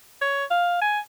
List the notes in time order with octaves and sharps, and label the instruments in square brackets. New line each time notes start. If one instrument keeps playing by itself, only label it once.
[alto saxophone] C#5
F5
G#5